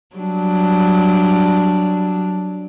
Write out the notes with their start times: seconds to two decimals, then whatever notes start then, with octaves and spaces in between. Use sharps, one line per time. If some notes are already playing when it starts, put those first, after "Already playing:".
0.16 F#3 G3 D4